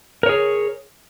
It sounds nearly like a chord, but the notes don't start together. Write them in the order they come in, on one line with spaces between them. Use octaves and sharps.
A#4 C#5 G#4